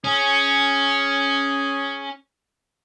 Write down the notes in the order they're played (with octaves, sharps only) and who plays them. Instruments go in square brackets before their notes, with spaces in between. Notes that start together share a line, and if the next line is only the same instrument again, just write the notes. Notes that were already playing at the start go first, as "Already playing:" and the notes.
[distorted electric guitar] C#4 [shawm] G#4